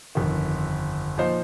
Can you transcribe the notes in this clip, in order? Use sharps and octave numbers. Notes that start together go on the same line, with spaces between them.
G1 F2 D#3
A#2 F3 D#4 C5